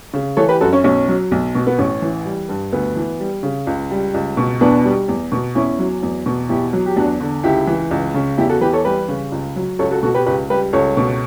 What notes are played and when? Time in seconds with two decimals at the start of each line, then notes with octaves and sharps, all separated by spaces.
0.13 C#3
0.37 E3 A4 C#5
0.49 G4 B4
0.61 F#2 F#4 A4
0.73 C#4
0.84 B1 C#4
1.08 F#3
1.31 B1
1.55 B2
1.67 B3
1.78 A1 C#4
2.02 E3
2.25 G3
2.49 G2
2.73 D2 B3
2.96 E3
3.20 G3
3.43 C#3
3.67 C#2
3.91 G3
4.14 C#2
4.37 B2
4.61 E2 B3 D4
4.85 G3
5.08 E2
5.32 B2
5.55 E2 C#4 E4
5.79 F#3
6.03 E2
6.26 B2
6.49 E2 E4 G4
6.73 F#3
6.86 G4
6.96 E2 D4 F#4
7.20 D3
7.43 C#2 E4 G4
7.67 E3
7.91 C#2
8.14 C#3
8.38 E2 E4 G4
8.49 F#4 A4
8.61 E3 G4 B4
8.73 A4 C#5
8.85 G3 G4 B4
9.08 C#3
9.32 C#2
9.56 F#3
9.79 C#2 A4 C#5
9.91 F#4 A4
10.02 B2 F#4 A4
10.15 G4 B4
10.26 C#2 G4 B4
10.50 G3 G4 B4
10.73 C#2 A4 C#5
10.97 B2